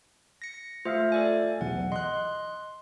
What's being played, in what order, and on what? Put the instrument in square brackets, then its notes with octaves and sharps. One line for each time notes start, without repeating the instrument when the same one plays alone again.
[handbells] A#6 C#7
[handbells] A3 C5 [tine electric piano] F4 E5 F5
[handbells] A4 D5 G#5
[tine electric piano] B1 E2 [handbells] F#5
[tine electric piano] D#5 [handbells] C6 F#6